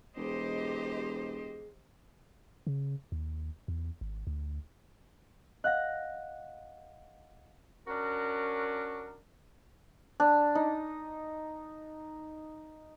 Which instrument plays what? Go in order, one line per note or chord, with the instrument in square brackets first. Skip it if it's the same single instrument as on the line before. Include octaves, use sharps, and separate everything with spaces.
[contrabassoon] E1 [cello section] G4 C5 D#5 [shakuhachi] G#4
[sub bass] C#3
D#2
E2
G#1
D2
[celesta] D#5 F5 F#5 [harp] F#6 A#6
[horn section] C#4 D4 F#4 A#4
[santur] D4
D#4